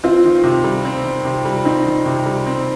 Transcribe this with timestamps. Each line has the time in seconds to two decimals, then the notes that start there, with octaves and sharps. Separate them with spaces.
0.04 C4 F4
0.24 D#3
0.44 C3
0.64 G3
0.85 C4
1.05 D#3
1.25 C3
1.45 G3
1.65 C4 D#4
1.86 D#3
2.06 C3
2.26 G3
2.46 C4